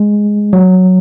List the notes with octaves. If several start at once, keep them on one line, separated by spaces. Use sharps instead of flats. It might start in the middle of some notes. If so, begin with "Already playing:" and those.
Already playing: G#3
F#3